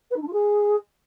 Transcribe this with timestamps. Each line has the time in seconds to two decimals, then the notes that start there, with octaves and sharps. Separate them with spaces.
0.10 B4
0.16 D#4
0.21 D4
0.27 F4
0.32 G#4